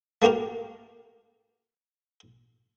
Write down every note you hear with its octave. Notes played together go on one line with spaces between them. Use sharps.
A3 A#3 F#4 G4 A#4